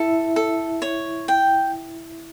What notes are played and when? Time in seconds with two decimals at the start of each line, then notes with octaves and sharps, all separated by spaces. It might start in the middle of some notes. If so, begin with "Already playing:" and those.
Already playing: E4 A4 E5
0.36 A4
0.82 C#5
1.28 G5